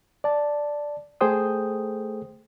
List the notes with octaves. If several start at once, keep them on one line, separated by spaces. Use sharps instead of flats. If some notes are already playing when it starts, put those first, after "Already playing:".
D5 A5
A3 G#4 A4 C5 G5 D#6